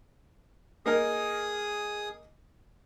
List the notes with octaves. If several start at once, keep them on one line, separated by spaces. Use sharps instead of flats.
A#3 D#4 G#4 A#4 D#6